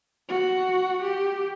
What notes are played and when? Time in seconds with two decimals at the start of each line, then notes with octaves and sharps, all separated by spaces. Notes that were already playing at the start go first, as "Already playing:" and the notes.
0.29 F#4
1.02 G4